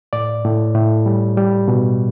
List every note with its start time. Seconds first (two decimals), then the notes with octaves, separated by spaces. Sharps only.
0.13 A2 D5
0.44 A2
0.75 A2
1.06 G3
1.37 G3
1.68 B2